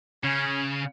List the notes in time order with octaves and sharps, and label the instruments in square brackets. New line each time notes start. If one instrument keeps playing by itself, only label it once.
[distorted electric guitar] C#3 [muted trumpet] C#4